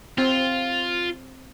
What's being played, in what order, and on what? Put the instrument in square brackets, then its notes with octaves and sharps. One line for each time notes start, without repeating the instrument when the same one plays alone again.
[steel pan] C4 [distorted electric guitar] F4